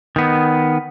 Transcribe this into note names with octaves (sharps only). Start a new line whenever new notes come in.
D#3 B3